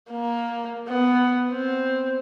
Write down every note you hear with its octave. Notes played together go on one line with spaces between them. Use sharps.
A#3
B3
C4